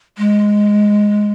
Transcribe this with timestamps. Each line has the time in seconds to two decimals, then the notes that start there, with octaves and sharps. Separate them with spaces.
0.18 G#3